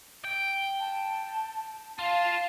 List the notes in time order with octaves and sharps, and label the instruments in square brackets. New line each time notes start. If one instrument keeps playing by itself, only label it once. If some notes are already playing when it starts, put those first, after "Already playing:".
[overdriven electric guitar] G5
[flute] A5
[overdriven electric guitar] F4 [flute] F5 [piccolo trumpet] A5